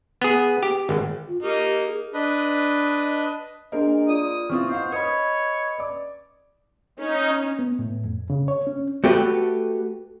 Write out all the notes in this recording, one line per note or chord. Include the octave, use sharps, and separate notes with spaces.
B3 G#4
G4
G#1
F4
A#3 D#4 G4
G#4
D4 B4 D#5
A#3 D4 G#4 A#4 C5 D#5
F4 D5 D#6
E3 C4 F4 C#6 D#6 F6
D#4 C5 F5 F#5
B4 C#5 D#5 B5 D#6
D5 D6
C#4 D#4
B3
A2
F2
C#3
C#5
C#4
A3 F#4 G4 A4 B4